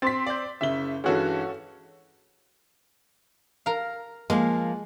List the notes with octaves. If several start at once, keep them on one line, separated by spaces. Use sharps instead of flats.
C4 C6 A6 B6
D5 G6
F#1 C#3 E5 G7
G2 E3 G#3 C#4 F#4 A4
A#4 F5
F3 G#3 A#3